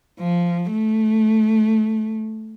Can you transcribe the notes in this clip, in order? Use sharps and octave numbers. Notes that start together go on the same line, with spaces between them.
F3
A3